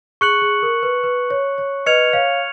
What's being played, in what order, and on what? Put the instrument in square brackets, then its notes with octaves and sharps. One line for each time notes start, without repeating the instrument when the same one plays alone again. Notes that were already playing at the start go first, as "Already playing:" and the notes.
[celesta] G#4 [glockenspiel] C#6 F#6 C#7 F#7
[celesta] G#4
A#4
B4
B4
C#5
C#5
[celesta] B4 D#5 [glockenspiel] F6 G#6 C#7 F7
[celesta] C#5 F5